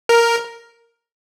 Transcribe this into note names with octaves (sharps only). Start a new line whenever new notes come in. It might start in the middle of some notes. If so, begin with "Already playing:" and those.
A#4